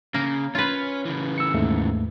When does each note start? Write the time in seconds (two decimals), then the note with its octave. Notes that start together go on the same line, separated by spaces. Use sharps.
0.14 C#3 A#3
0.55 C#4 F4 B4
1.05 C#3 E3
1.38 E6 C#7
1.54 D#2 G#2 A3